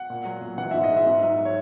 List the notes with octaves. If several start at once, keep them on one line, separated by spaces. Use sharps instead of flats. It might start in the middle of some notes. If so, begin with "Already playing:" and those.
Already playing: F#5
A#2
F#3
A#2
E3 F#5
G#2 E5
D#5
G#3
E5
G#2
F#3
C#5